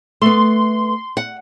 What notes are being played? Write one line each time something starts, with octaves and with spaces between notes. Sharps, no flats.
A3 B3 C6
F#5